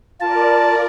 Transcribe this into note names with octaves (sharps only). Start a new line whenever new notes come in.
F4 A#4 D5 A5